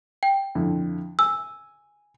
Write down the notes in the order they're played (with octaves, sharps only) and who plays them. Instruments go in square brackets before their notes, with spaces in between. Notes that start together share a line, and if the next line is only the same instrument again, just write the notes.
[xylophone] G5
[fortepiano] F2 D3 E4
[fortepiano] G#5 [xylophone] E6